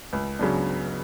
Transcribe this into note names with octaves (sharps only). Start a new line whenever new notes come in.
C#2
C#3 F#3 B3 D4